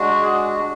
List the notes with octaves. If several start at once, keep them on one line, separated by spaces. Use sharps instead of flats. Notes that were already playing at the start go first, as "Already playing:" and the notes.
Already playing: G#3 D4 F#4
G#4